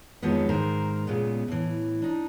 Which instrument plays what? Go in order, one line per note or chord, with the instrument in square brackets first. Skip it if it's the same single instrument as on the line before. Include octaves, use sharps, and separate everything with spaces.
[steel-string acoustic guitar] F2 D#3 F3 F#3 G#3 B3
G#2 D#3 A#4 C5
A#2 C#3 G#3 B3
A2 E3
D4 D#4